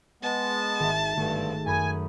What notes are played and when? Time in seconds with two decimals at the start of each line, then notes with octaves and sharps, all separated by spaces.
0.23 G#3 B3 A5
0.80 G#1 E5
1.17 G#1 G2 D3 A3 G#4
1.66 F#2 G#5 B5 D#6